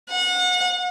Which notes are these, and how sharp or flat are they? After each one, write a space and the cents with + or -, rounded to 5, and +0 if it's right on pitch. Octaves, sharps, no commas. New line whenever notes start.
F#5 -35